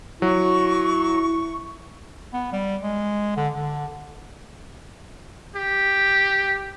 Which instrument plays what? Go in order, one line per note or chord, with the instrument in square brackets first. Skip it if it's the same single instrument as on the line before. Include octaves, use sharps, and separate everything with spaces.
[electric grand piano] F#3 [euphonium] E4 [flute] C#6
[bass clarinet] B3
G3
G#3
D3
D3
[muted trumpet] G4